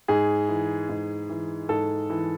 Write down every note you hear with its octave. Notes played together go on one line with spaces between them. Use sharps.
G#2 G#4
E3
G#2
E3
G#2 A4
E3